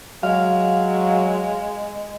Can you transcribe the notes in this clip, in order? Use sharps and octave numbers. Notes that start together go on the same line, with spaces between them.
F#3 G#3 F5